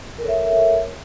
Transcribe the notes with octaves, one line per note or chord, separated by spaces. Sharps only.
A4 A#4 C#5 E5